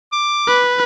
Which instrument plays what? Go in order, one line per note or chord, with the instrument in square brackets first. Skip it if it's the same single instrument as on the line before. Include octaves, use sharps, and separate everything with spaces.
[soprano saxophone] D6
[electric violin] B4